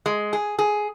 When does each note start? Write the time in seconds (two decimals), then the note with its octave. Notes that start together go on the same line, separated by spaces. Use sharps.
0.06 G#3
0.33 G#4
0.59 G#4